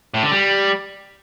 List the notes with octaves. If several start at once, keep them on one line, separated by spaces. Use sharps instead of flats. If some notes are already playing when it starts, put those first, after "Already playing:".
A2
D3
G3